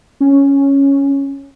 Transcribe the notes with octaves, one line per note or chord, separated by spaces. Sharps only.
C#4